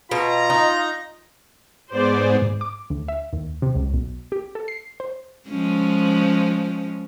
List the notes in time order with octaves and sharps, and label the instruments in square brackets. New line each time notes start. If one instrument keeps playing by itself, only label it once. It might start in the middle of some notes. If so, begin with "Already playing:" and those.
[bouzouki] B2 [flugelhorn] F4 [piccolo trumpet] A#5
[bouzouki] D#4
[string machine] G#2 B3 G#4 [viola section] C5 D5
[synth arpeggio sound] G#2
D6
D2
E5
D#2
C3
C#2
B1
G4
A4
C7
C5
[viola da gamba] F3 G#3 C#4